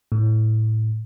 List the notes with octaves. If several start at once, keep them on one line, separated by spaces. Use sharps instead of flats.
A2